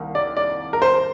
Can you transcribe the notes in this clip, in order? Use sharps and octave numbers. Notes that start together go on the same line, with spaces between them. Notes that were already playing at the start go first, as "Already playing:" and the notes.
Already playing: C2 D#3 A#3
D5
D5
A#4
C5